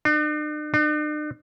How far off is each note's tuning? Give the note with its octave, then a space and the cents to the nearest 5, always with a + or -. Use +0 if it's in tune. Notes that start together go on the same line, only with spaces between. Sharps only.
D4 +45
D4 +45